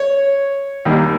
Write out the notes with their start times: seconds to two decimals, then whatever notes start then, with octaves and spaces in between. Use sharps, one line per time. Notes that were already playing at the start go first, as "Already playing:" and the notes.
Already playing: C#5
0.85 D#2 D#3 G3 A#3